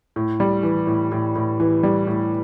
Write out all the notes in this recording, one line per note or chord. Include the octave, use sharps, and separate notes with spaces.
A2
G3
E3
A2
A2
A2
E3
G3
A2